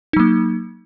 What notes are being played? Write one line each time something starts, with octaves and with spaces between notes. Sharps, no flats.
F#3 A#3 D#4